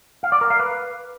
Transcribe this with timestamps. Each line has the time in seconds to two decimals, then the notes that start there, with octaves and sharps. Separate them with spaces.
0.23 F5
0.32 D5
0.41 A#4
0.50 F5
0.59 B4